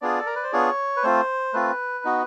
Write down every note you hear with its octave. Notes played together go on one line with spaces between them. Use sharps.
B3 D4 F4 G#4 D5
A4
A#4
B4
C5
B3 D4 F4 G#4 C#5
B4
A3 C4 F4 C5
A3 C4 F4 B4
B3 D#4 F#4